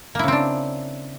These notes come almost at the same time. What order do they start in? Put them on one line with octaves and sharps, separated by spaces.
A#3 E4 C#3 C4 D4